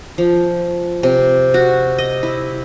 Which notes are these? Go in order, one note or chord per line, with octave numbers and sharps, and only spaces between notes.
F3
C3
F#4
D#5
E4